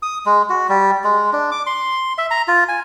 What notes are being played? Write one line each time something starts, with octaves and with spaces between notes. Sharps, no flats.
D#6
G#3
F#4
G3
G#3
D4
D6
C6
E5
A#5
F4
G#5